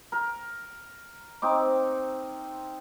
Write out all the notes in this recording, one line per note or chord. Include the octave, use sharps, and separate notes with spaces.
A#4
C4 D#4 D6